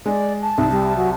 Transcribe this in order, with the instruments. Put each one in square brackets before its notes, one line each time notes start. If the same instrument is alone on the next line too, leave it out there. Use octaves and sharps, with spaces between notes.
[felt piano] G#3 [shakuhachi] D5
[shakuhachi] A5
[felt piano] C2 [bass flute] D#4
[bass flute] G3
F#3